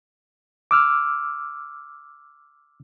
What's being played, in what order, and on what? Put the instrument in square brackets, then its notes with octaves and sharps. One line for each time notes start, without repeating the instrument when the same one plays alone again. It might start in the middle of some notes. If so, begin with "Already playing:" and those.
[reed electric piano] D6 E6 F6